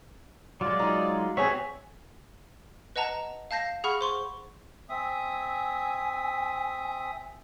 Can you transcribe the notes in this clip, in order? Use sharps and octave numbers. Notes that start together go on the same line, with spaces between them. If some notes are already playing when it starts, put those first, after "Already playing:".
F#3 G#3 F4 D5
D#4 F4
C4 F#4 G#4 C#5 E5
B4 D#5 F#5 A5 A#5
F5 A5 G6 A#6 C7
G#4 F#5 B5 C#6 F6
C5 C6 C#6
C4 E5 G#5 D#6